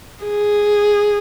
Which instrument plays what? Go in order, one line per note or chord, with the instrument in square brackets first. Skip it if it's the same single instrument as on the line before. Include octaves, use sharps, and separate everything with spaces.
[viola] G#4